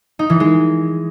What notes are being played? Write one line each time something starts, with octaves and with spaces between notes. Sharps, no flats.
D#4
E3
G#3